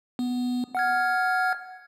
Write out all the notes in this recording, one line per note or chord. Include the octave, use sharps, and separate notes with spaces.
B3
F#5 F6 G#6